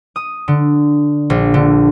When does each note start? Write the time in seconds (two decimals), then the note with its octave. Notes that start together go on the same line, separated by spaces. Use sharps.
0.16 D#6
0.48 D3
1.30 A#1
1.54 D3